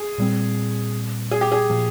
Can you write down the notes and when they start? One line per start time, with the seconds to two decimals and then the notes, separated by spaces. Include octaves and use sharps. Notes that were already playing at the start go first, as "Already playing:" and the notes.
Already playing: G#4
0.18 A#2 G3 C4
1.31 G#4
1.41 G4
1.52 G#4
1.70 A#2 F3